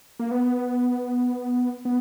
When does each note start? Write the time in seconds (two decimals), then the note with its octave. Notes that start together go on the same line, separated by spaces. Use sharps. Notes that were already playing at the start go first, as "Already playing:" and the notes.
0.20 A#3
0.31 B3
1.85 B3